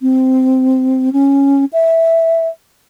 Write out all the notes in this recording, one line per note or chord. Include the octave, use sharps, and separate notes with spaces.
C4
C#4
E5